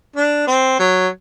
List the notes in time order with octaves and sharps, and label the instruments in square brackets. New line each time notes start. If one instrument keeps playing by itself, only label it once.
[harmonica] D4
C4
F#3